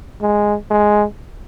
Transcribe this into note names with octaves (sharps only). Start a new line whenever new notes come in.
G#3
G#3